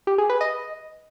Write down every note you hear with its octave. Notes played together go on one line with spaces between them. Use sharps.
G4
G#4
B4
D#5